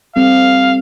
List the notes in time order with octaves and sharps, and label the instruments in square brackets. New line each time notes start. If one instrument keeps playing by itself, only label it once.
[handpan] G3 C4 A4 [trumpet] F5